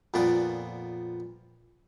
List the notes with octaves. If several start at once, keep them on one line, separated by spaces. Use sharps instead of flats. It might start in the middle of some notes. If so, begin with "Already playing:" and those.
F2 A#2 B3 D5 D#6